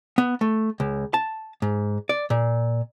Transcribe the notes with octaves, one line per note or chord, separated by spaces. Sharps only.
B3
A3
C#2
A5
G#2
D5
A#2